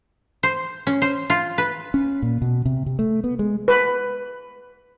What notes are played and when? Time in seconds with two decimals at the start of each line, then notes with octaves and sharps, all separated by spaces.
0.43 C5
0.87 C#4
1.02 C5
1.30 F4
1.58 B4
1.94 C#4
2.22 A#2
2.42 B2
2.65 C3
2.86 C3
2.99 A3
3.24 B3
3.39 G#3
3.68 B4